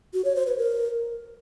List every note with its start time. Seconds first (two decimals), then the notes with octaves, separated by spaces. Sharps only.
0.13 F#4
0.24 C#5
0.35 C5
0.46 B4
0.57 A#4